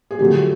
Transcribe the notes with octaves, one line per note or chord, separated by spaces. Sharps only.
G#4
F2 D3 F#3 A3 G4